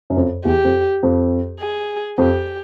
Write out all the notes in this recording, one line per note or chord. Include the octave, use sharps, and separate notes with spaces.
F#2
F2
E2 G4
F2
F2
G#4
F2 G4